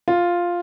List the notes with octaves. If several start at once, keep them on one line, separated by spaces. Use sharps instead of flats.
F4